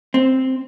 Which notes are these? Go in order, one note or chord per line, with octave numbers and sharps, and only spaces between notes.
C4